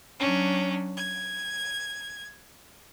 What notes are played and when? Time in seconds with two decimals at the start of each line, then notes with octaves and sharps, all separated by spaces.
0.19 F#3 C#4 D4
0.96 G#6